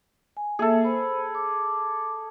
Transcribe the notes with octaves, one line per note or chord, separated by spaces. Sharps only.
G#5
A#3 G#4 A4 E5
C5 B5
D6